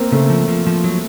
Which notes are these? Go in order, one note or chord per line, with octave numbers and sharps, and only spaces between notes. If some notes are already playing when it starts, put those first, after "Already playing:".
Already playing: A#3 C4
C#3 A3
F3
F3
F3
F#3